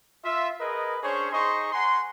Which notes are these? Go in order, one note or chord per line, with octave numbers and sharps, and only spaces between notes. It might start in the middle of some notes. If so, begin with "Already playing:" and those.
F4 E5
G#4 A#4 B4 D#5
C#4 D4 G#4 C5 C#5
D#4 G#4 C5 D#5 C6 C#6
F#5 G#5 A#5 C6